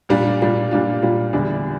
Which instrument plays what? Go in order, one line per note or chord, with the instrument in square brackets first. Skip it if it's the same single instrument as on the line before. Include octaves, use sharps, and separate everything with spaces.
[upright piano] A#2 G3 D4 F4
A#2 G3 D4 F4
A#2 G3 D4 F4
A#2 G3 D4 F4
E2 D3 G3 D4